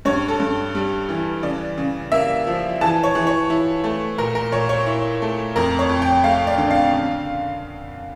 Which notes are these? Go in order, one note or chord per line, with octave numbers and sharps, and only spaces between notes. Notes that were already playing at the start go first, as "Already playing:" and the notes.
G2 C#5
A4
G2
G3
E3
C#3 D5
C#3
A#3 E5
F3
E3 A5
C#5
E3
C#5
E4
A3
A#2 A#4
A#4
A#2 C#5
C#5
E4
A3
F2 A#4
C#5
F2
G5
A3 F5
D5
D3
F5
C#3